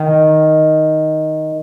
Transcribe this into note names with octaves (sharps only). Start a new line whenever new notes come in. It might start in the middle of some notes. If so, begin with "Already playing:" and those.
Already playing: D#3